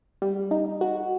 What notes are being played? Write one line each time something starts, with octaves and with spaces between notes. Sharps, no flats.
G3
D#4
F#4